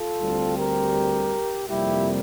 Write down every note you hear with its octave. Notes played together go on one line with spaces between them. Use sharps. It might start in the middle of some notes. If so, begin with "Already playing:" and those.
Already playing: F4 A4
D2 D3 G3 C4
G4 A#4
F2 C3 G3 A#3 E4 G4